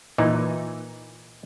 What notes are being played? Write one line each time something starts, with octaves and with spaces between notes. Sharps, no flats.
A#2 E3 D#4